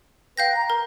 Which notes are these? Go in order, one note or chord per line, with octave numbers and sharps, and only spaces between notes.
B4 F5 G5 G6 A#6
A#5
A#4